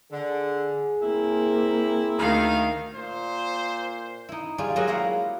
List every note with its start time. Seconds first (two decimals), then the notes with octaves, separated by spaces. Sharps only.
0.11 D3 G#4
1.02 A#3 C4 E4
2.18 D2 D#3 F5
2.95 A#2 C5
4.29 D#4 E4
4.58 G3 F4 G#4 D5
4.76 F#3 G#3 A#3 F4 F#4 G#4
4.87 E4 G4 F5 F#5 A#5